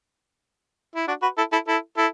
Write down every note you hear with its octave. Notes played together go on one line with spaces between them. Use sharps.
E4
D4 F#4
F#4 B4
E4 A4
E4 A4
E4 A4
E4 A4